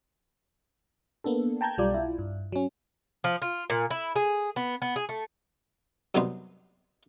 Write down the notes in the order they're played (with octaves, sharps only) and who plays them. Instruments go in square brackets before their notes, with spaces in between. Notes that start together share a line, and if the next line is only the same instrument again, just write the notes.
[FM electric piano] A#3 B3 D4 A4
G5 A5 A#5 G6 G#6
B1 G3 F4 D5
E4 F4
G2
F#3 C#4
[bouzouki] F3
F4
A#2
E4
G#4
B3
B3
G#4
A3
[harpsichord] F#2 C3 G3 B3 D#4 C6